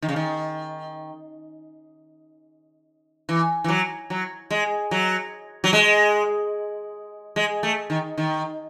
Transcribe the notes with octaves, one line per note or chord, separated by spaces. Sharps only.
D#3
C#3
D#3
E3
E3
F#3
F#3
G#3
F#3
F#3
G#3
G#3
A3
D#3
D#3